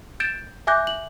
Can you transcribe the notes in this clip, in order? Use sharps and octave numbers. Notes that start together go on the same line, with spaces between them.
G6 A6 D7 E7
E5 G#5 D6 F#6 G6 A#6
F#7